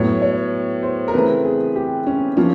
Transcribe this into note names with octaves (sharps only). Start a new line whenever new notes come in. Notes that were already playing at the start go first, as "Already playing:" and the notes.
Already playing: A2 F#3 B3 C#5
C#5
C5
A#4
C#3 E3 A3 C4 B4
G#4
G4
C#4
F3 A#3 C#4